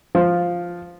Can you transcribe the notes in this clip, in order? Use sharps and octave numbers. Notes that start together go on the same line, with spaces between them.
F3